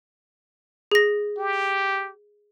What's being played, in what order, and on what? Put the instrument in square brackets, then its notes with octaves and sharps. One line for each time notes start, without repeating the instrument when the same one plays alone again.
[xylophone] G#4 A#6
[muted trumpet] G4